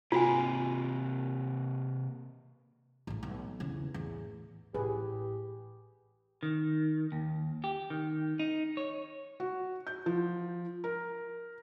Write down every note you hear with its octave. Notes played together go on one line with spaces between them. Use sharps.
C3 A#3 F4 F#4 G#5
A1 A3
B1
E2 C#3
E2 A2
A1 G4 G#4 B4
D#3
D#2
G4
D#3
D#4
C#5
F#4
G6
F3
A#4